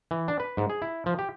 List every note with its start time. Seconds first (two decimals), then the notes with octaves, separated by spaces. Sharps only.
0.11 E3
0.28 D4
0.40 B4
0.57 G#2
0.70 G#4
0.82 E4
1.06 F3
1.19 G4